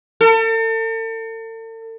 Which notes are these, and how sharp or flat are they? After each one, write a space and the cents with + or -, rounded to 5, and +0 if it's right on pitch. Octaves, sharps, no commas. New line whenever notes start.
A4 +40